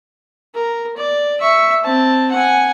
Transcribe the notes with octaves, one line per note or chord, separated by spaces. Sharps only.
A#4
D5
E5 C#6
C4 A5
F#5 G#5